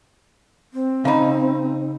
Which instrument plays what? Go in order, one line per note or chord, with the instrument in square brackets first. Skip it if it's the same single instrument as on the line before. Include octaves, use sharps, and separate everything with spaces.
[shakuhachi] C4
[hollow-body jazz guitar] C#3 D#4 [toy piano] F5 A#5 B5